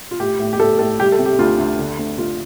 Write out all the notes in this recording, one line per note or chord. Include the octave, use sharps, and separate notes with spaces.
F4
A2 G4
A2
G4
A2 A4
A2 A4
G3 G4
A4
C3
G4
D2 F4
D2
D3
D2
D2 F4